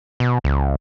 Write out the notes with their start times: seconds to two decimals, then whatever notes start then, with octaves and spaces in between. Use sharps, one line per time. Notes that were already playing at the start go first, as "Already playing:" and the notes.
0.20 B2
0.44 C#2